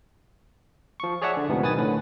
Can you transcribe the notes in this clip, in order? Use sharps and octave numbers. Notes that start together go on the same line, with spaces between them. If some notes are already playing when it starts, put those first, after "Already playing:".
F3 C#6
G#4 C#5 D5 E5 F#5 A5
D3
D2 G#2 C3 F3 B3
B1 D#3 B4 G#5 D#6 A6
A2 D3 B4